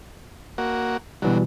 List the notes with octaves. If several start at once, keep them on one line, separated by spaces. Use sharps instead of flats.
A#3 F#4
B2 D3 E3 F#3 G3